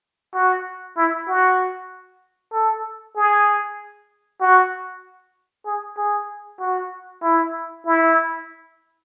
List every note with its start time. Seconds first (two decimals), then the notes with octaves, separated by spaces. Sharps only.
0.34 F#4
0.97 E4
1.28 F#4
2.53 A4
3.16 G#4
4.41 F#4
5.66 G#4
5.97 G#4
6.60 F#4
7.23 E4
7.85 E4